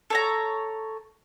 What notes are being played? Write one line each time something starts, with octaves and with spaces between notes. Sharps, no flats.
A4 C#5 A#5